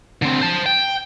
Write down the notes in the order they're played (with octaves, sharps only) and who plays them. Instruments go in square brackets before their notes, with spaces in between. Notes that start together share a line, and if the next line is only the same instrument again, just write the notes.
[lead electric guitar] D3 C4
C5 A5
G5